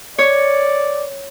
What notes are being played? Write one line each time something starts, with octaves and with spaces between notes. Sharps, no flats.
C#5 D5